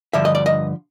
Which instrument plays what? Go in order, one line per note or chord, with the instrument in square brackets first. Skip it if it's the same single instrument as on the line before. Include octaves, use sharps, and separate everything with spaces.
[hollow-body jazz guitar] G2 D3 F3 E5
D#5
D5
D#5